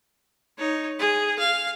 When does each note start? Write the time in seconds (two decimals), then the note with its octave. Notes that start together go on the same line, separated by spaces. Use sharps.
0.58 D#4 C#5
0.99 G#4
1.39 F5